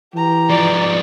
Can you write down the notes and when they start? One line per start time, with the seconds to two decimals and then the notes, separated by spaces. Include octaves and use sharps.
0.15 E3 G4 A#5
0.50 F3 B3 D5